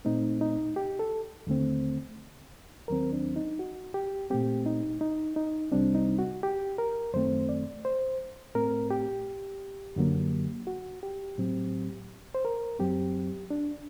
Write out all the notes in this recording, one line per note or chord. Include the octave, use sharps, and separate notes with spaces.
A#2 A3 C4 D#4
D#4
G4
A4
D#2 D3 A3 C4
D#2 D#3 F#3 C4 A#4
D4
D#4
F#4
G4
A#2 A3 C4 G4
D#4
D#4
D#4
C2 C3 G3 C4 D4
D#4
F#4
G4
A#4
F#2 D#3 A3 C4 C5
D5
C5
A2 A3 C4 A#4
G4
F#2 D3 F#3 A#3
F#4
G4
A2 F#3 C4
C5
A#4
F#2 F#3 C4 G4
D4